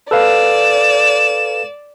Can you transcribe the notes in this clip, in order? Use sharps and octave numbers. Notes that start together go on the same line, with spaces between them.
A4 B4 D5 F5 E7